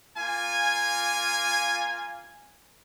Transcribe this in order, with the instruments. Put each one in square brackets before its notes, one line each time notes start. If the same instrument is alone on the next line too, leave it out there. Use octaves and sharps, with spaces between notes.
[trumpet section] A#3 F4 G#5